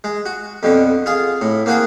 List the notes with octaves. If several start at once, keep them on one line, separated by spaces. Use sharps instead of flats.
G#3
F#4
F2 B2 D3
F4 G#4
A2
A#3 C4 F#4 G#4